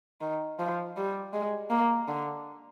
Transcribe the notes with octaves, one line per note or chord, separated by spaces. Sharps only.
D#3
F3
G3
G#3
A#3
D3